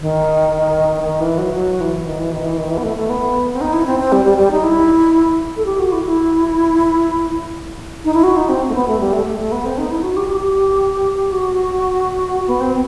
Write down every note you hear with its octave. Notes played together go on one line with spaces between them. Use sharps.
D#3
D#3
E3
F#3
F#3
E3
D#3
E3
D#3
E3
D#3
E3
B3
A3
A3
B3
C4
D#4
E4
C4
C4
G3
G3
G3
D#4
E4
A4
G4
F#4
E4
E4
D#4
E4
F#4
D#4
C4
A3
B3
A3
G3
A3
A3
A3
B3
C4
D#4
E4
F#4
G4
G4
F#4
B3
C4